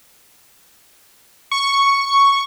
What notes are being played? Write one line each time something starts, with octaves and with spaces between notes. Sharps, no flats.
C#6